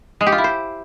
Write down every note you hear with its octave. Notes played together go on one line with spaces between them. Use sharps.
G#3
G4
F4
E4
C5